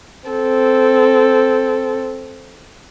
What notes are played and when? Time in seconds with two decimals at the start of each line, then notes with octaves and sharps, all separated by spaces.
0.29 C4 A4